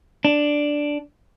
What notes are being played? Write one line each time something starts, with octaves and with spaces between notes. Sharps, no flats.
D4